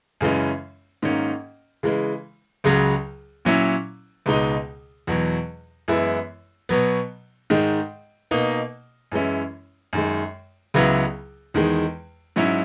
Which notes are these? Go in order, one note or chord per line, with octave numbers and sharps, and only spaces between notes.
F#2 C#3 E3 G#3 C#4
G#2 D#3 A#3 C#4
C#3 E3 G#3
C#2 C#3 F#3
A#2 F#3 C#4 E4
C#2 B2 G#3 D#4
E2 B2 F#3
F#2 E3 G#3 B3 E4
B2 F#3 B3
G#2 D#3 G#3
B2 A#3 D#4
F#2 E3 G#3 C#4 E4
F#2 D#3 G#3
C#2 C#3 F#3 B3 E4
E2 D#3 G#3
G#2 F#3 C#4 E4